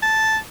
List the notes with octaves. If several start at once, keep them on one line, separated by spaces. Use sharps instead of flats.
A5